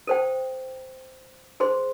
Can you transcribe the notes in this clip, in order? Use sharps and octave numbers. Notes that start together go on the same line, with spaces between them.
A4 C5 G5
G#4 C5 C6